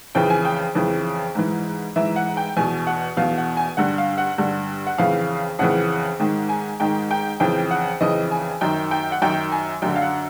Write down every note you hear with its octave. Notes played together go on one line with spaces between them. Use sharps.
F2 C#3 E3 G5
G#5
G5
F2 C#3 E3
G#2 E3
G#2 E3 E5
F#5
G5
E2 B2 G#5
F#5
E2 B2 F5
F#5
G#5
G2 D3 F#5
F5
F#5
G2 D3
F#5
F2 C#3 E3 F5
F2 C#3 E3 F#5
G#2 D#3
G#5
G#2 D#3 G5
G5
F2 C#3 E3 G5
F#5
F2 C#3 E3 D#5
G#5
F#2 D#3 G5
G5
F#5
F#2 D#3 G5
G#5
F#2 D3 G5
F5
F#5